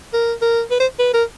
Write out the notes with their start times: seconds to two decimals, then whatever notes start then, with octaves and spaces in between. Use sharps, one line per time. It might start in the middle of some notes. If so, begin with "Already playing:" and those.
0.13 A#4
0.42 A#4
0.70 B4
0.80 C5
0.99 B4
1.13 A#4